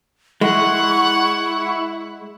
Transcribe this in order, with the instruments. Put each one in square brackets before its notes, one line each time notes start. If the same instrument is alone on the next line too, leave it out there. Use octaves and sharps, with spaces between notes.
[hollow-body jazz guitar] G#3 [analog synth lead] E4 [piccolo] F#5 [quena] C#6